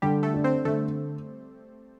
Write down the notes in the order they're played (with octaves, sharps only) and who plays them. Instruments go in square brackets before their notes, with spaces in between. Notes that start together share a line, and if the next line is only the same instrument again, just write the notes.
[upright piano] D3 [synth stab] G3 G4
[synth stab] A3 A4
[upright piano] D4
[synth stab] C4 C5
[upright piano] D3 [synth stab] A3 A4